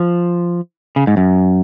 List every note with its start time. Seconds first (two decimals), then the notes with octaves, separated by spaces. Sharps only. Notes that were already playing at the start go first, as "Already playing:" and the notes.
Already playing: F3
0.96 C#3
1.07 G#2
1.17 F#2